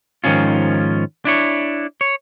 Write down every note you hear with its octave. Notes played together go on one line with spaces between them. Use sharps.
G#2 D#3 F3 C#4 F4
D4 E4 C#5
C#5